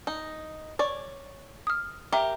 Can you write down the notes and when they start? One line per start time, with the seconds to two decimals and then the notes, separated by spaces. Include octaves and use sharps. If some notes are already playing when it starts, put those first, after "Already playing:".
0.07 D#4
0.79 C#5 D5
1.67 D#6 F6
2.12 G4 A#4 E5 A#5